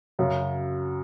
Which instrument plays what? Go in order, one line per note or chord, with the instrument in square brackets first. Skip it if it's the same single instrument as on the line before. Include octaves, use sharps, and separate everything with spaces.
[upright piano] F#2 C#3 F#3